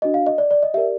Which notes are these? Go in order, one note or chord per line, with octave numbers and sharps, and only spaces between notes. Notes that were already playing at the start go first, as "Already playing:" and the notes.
D4 F#4 B4 D#5
F5
D#5
D5
D5
D#5
G4 A#4 D5 E5